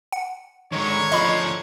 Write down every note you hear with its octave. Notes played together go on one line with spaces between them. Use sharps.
F#5
G#2 D3 D#3 G#3 C#5
D2 F3 D#5 B5 C#6